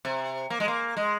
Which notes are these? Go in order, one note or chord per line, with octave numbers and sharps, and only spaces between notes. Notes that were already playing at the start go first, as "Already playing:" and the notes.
C3
A#3
G#3
A#3
G#3